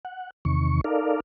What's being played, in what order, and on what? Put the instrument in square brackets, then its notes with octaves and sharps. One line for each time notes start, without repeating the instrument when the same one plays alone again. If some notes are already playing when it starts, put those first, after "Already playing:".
[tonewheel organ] F#5
E2 C3 D#3 C#6
D#4 A4 A#4 D5 F5